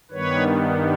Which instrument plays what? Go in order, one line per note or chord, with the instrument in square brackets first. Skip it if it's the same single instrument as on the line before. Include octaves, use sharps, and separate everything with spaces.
[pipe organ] G2 D#3 G3 B3 B4 C#5